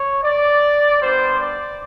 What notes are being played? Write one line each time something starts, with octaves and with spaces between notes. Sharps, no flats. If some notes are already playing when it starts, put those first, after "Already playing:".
Already playing: C#5
D5
G3 B3 D4 C5
D5